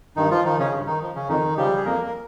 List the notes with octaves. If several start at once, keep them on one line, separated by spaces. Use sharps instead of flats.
G2 D#3 D#4
F3 F4
D#3 F3 D#4
C#3 C#4
G2
D#3 D#4
F3
C#3 C#4
F2 D#3 D#4
C#3 F3 G3 G4
G#4
F2 A#3 A#4
A#4